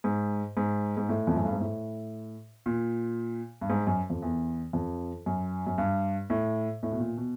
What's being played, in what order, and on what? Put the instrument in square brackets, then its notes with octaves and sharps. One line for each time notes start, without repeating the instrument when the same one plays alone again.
[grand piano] G#2
G#2
G#2
A2
F2
F#2
G2
G#2
A2
A#2
G2
G#2
F#2
F2
E2
F2
F#2
F#2
G2
A2
A2
B2
A#2
B2